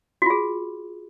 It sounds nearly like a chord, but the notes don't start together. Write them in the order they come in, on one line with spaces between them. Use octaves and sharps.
F#4 F4 G#4